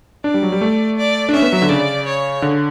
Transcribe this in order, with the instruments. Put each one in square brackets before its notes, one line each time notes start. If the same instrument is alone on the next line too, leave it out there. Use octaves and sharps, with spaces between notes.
[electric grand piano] D4 [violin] D5
[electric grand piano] G3
F#3
G3
A3
[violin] D5
[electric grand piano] D4
[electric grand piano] C#4 [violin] E5
[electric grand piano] B3
F#3
D3
[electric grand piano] C#3 [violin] D5
[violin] C#5
[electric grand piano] D3